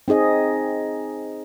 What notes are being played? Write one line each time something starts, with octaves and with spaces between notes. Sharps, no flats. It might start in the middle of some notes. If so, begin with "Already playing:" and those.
C4 D#4 G#4 D#5